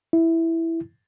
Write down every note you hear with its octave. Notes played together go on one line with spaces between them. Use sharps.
E4